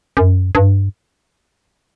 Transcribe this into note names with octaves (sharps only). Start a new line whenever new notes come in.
F#2
G2